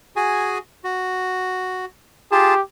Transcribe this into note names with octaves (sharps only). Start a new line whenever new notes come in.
F#4 G#4 G#5
F#4
F4 G4 G#4 A5